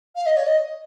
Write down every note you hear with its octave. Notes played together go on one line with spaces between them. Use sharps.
F5
D#5
C#5
D#5